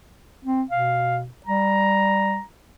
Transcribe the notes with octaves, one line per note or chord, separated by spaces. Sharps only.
C4
B2 F5
G3 A#5